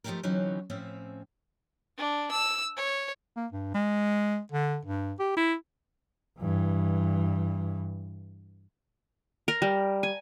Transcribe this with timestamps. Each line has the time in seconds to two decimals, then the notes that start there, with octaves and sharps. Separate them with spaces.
0.04 F3 A3 B3 D#4 G4 A#4
0.23 D3 E3 F#3 C4 C#4 D#4
0.70 A2 F3 C4 C#4 E5
1.98 D4
2.31 E6
2.77 C#5
3.36 A#3
3.52 G2
3.74 G#3
4.52 D3
4.85 G2
5.19 G4
5.37 E4
6.39 G2 E3
9.48 A#4
9.62 G3
10.03 G#5